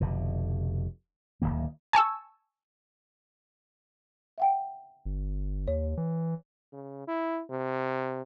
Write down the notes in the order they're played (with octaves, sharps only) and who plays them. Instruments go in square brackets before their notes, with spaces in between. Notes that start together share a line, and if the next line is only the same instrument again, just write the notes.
[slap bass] F1 B2 D3
D1 G#1 D#3 A#3
[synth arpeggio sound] G#5 A5 C#6 E6
[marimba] E5 F#5 G5
[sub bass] G1
[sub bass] D#2 [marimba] C#5
[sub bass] E3
[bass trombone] C#3
E4
C3